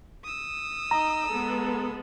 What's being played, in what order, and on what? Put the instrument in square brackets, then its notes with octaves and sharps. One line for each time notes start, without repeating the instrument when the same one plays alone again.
[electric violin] D#6 E6
[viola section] D#4 D#5 [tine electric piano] A#5
[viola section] G#3 B3 A4